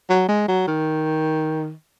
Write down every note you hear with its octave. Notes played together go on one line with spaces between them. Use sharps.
F#3
G#3
F#3
D#3